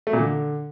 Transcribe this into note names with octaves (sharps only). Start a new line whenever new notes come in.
A3
A#2
D3